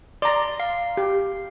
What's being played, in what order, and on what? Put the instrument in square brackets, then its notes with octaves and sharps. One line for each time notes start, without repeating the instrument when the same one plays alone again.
[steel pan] D5 A#5 [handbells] C6
[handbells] F5
[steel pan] G4